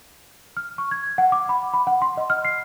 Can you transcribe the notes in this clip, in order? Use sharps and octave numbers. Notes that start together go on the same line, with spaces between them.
F6
C#6
G#6
F#5
D6
B5
B5
F#5
C6
D#5
F6
C7